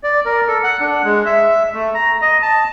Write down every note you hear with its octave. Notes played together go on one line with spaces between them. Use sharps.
D5
A#4
A4
F#5
D4
G#3
E5
A3
A#5
D#5
A5